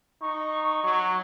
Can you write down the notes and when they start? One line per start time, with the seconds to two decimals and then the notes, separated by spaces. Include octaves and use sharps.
0.21 D#4 C#6
0.84 F#3